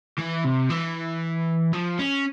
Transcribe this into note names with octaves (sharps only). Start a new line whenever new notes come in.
E3
C3
E3
F3
C#4